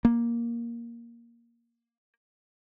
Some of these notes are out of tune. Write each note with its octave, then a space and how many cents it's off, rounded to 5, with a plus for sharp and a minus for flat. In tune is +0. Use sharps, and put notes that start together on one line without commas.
A#3 +10